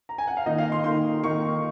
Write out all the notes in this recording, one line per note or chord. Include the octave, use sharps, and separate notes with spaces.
A#5
G#5
F#5
F5
D#3 A#3 D#4 D#5
F5
C6
D#3 A#3 D#4 C6
D#3 A#3 D#4 C#6